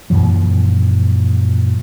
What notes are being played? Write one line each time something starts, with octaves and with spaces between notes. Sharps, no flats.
F#2 A#2 E3 F3